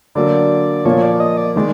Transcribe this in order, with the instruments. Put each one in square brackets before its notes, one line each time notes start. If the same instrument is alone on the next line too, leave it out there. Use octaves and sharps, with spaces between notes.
[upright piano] D3 F#3 A#3 [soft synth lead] D5
[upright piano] A#2 F3 A#3 [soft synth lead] C#5
[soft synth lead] D5
D#5
D5
[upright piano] D#3 G#3 [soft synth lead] D5